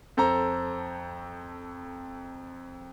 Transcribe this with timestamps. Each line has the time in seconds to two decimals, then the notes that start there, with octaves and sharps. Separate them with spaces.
0.17 F2 A4 C5 A5 A#5